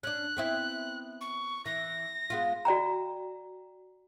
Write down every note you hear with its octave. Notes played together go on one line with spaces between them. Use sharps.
C#4 D4 F#6
B3 C4 E4
C#6
E3 A#6
G#3 B3 F4
F#4 D5 G5 A#5